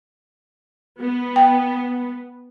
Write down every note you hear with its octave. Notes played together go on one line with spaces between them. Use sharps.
B3
G5